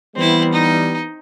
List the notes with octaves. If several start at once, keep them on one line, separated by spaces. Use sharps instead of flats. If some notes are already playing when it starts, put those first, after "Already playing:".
E3 G3 B3 C4 E4
D#4